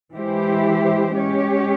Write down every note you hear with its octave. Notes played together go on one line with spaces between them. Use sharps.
E3 G#3 E4 G4 C5
G#3 C#4 G4 C#5